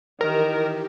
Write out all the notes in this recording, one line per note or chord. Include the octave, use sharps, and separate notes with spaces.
D#3 E3 G4 A#4